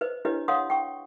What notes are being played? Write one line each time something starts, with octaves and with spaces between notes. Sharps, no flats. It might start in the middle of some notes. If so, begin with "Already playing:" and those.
B4 C5 D#5
D4 E4 G4 B4 C#5 D#5
C#5 D#5 F5 F#5 C6 D#6
G5 C#6